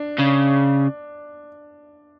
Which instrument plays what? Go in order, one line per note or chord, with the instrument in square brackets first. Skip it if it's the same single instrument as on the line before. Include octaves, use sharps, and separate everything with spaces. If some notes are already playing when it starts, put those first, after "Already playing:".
Already playing: [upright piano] D4
[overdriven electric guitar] C#3